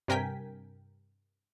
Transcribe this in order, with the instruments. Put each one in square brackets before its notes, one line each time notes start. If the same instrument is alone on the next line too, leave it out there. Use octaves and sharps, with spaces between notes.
[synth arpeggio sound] G2 C3 A#4 G5 G#5 B6